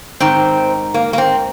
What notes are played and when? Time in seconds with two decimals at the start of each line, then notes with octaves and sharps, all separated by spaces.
0.20 G#2 D#3 C4
0.94 A#3
1.13 A#3
1.18 C4